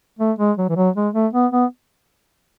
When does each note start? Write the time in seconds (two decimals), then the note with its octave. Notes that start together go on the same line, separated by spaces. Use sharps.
0.19 A3
0.39 G#3
0.57 F#3
0.69 E3
0.76 F#3
0.96 G#3
1.14 A3
1.33 B3
1.52 B3